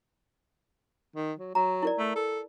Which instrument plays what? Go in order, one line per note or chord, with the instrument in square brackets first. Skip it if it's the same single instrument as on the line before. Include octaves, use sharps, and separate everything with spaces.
[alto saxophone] D#3
F#3
[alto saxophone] F#3 [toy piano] A#5
[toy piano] E4 A#4 D5
[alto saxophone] A3
A4